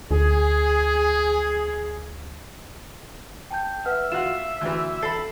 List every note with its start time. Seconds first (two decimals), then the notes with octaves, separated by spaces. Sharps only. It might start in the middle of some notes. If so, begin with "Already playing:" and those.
0.11 D2 G#4
3.51 G5 A5 G6
3.85 B4 E5 F#5 F6
4.12 F4 F#4 E7
4.61 D2 E3
5.02 A4 B5 C7